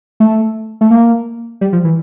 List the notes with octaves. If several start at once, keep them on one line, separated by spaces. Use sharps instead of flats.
A3
A3
A#3
G3
F3
E3